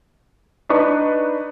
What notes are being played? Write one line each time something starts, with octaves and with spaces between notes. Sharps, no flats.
D4 D#4 B4 C#6